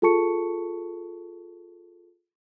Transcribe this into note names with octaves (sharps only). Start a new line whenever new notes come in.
F4 G#4 A4 A5 C#6 C#7